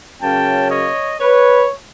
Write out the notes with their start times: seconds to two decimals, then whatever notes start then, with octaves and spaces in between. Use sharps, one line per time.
0.21 C#3 F#3 A#3 C#4 G5 A5
0.70 C#5 D#5
1.20 B4 C#5